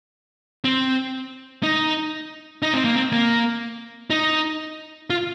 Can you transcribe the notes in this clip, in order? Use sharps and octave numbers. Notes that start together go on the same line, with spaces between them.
C4
D#4
D#4
C4
A#3
C4
A#3
D#4
F4